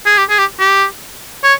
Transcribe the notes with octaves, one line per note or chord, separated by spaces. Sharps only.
G#4
G4
G#4
G4
G4
C#5